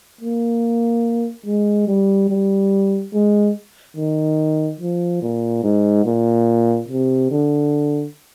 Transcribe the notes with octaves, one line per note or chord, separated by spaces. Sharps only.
A#3
G#3
G3
G3
G#3
D#3
F3
A#2
G#2
A#2
C3
D3